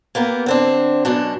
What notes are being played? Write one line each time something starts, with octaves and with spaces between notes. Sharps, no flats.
A#3 B3 G4 A#4
D3 C4 D4
F#2 B2 D4